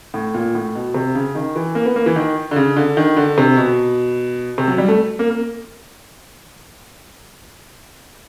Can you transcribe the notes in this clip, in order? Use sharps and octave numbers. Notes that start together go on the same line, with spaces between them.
A2
A#2
A2
B2
C3
C#3
D#3
E3
A#3
B3
A#3
E3
D#3
D3
C#3
D3
D#3
D3
C3
B2
C3
F#3
G3
A3
A#3
A#3